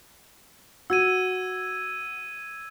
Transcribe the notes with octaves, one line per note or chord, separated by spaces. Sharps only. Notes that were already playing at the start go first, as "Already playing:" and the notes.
F#4 E6 G#6 D#7